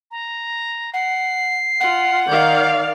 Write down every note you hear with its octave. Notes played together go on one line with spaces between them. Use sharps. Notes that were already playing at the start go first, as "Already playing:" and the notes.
A#5
F#5 C7
F4 F#5
D#3 D5 F5 G6